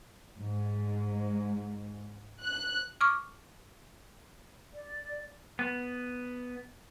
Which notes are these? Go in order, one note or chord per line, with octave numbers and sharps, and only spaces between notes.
G#2
F#6
C#6 D6 F6
D5
B3